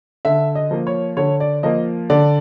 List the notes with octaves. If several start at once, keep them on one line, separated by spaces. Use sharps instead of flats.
D3 E5
D#5
F3 A#3
C#5
D3 C#5
D5
F3 A#3 D#5
D3 D5